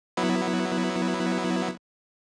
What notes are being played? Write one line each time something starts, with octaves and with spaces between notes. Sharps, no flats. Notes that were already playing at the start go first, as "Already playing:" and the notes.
F#3 B3 E4